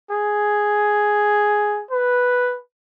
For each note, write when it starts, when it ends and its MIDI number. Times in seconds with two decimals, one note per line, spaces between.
0.11 1.83 68
1.91 2.57 71